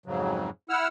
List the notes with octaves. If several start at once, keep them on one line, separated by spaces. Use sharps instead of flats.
F2 G#2 C#3 F#3
E4 F#5 E6 F6